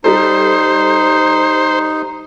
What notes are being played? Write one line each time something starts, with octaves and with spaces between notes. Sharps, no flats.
G3 D#4 A4 C5